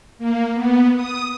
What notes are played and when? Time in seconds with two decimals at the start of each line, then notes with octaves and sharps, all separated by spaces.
0.18 A#3
0.53 B3
0.96 D#6